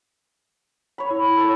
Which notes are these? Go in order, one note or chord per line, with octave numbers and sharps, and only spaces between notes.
C#5 B5
E4
A4 C#5